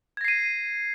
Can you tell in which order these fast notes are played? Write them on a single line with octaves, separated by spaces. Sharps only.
G#6 A#6 C7 D#7